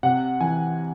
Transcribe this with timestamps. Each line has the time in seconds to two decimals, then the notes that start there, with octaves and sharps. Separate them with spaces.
0.03 C3 F#5
0.41 E3 G#5